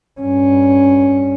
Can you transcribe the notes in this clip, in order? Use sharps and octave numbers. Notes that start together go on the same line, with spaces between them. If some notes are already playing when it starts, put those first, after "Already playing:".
G2 C#4